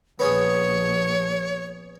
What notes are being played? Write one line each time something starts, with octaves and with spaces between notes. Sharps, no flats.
A#1 B3 C#4 G#4 C#5